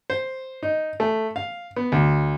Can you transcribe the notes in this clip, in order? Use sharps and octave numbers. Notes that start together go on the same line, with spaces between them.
C5
D#4
A3
F5
B3
D2